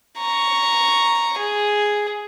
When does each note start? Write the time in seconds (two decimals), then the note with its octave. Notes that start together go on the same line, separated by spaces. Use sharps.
0.18 A#5 C#6
1.38 G#4